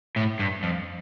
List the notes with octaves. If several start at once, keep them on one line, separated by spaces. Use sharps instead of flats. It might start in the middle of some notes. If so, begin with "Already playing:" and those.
A2
G2
F2